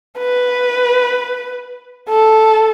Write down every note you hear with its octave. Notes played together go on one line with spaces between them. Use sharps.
B4
A4